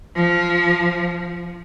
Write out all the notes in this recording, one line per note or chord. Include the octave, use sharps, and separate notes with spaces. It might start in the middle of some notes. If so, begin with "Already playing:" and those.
F3